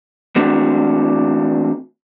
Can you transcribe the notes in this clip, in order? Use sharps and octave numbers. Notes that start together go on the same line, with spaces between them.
E3 A3 C4 D4 F#4